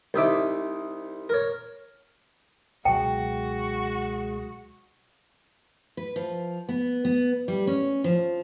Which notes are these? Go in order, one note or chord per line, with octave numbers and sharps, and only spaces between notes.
C2 D#4 E5 D6
A#4 C#5
C#2 B2 F#3 G#3 F#4 G#4 G5
B4
F3
B3
B3
G3
C#4
F3